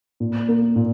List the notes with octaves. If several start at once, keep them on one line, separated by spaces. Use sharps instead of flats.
A#2
A#3
A#2